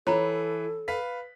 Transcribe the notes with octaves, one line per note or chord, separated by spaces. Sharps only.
E3 A4 C#5 A#5 B5
B4 F5 B6